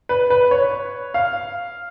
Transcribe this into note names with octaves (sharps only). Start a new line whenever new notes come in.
B4
B4
C#5
F5